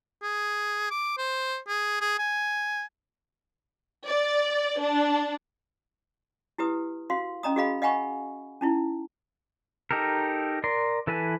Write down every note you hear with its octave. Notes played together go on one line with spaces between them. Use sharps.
G#4
D6
C5
G#4
G#4
G#5
D5
D4
E4 G4 B4 D#6
F#4 F5 C6
C#4 D#5 A#5 D#6
F#4 G#4 D#5 F5 B5
D#5 F5 F#5 G#5 B5 C#6
C#4 D#4 E4
D#4 G4 A4 A#4
A#4 D5 C6
E3 A4 B4 G#5